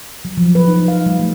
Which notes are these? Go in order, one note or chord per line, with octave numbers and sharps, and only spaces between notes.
F#3
F3
B4
D#4
F5
G3
A3